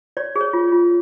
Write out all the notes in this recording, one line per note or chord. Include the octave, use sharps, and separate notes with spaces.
C#5 D5
G#4
C#5
F4
F4